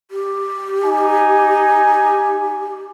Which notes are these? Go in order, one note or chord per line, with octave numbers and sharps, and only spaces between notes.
G4
D#4 G#5